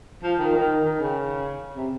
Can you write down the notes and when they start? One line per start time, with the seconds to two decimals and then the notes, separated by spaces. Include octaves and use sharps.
0.23 F3
0.39 D#3
0.54 D#3
0.84 D#3
0.99 C#3
1.76 C3